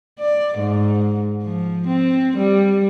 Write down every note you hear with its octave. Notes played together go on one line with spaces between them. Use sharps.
D5
G#2
F3
C4
G3